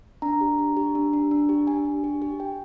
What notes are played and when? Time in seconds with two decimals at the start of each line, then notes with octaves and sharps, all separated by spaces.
0.22 D4 A#5
0.41 G4
0.59 D4
0.77 G4
0.95 D4
1.13 D4
1.31 D4
1.49 G4
1.67 D4 G#5
1.85 D4
2.04 G4
2.22 G4
2.40 G4 G5